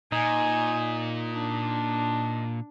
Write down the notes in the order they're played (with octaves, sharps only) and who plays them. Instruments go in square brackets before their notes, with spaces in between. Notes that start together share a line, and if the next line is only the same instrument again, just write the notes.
[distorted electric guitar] A#2 [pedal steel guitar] D#4 [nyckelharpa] G#5
[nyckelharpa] D4